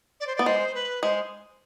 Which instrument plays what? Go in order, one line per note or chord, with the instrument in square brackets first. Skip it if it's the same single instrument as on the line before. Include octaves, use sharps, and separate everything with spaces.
[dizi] D5
C5
[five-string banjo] B3 [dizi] D5
[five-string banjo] G#3 [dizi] C5
[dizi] B4
[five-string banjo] G#3 [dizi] C5